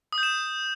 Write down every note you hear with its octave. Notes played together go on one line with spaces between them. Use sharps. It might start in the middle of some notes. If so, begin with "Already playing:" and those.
D#6
G6
E7